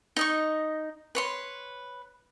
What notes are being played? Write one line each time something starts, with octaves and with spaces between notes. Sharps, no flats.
D#4 D#5 C#6
B4 C#5 C6